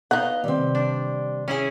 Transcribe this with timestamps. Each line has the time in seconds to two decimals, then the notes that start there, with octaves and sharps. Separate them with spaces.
0.11 B3 D#4 D#5 F5 F#5
0.44 C3 D#3 G3 C4
0.75 D4
1.48 C#4 E4 G#4